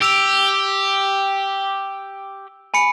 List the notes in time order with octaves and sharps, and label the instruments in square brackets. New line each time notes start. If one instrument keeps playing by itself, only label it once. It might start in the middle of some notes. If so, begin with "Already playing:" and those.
[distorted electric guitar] G4 [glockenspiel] E6 D7 F7
[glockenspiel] G#5 B5 C#7